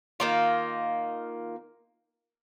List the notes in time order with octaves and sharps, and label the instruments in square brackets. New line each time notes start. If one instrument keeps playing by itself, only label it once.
[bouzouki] D#3 A#3 F4